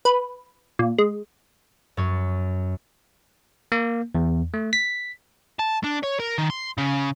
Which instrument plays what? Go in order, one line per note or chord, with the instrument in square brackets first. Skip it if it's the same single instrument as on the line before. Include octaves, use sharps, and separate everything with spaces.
[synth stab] B4
A#2
G#3
[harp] F#2 C#5
[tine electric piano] A#3
E2
A3
B6
[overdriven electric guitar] A5
D4
C#5
A#4
D#3
C6
C#3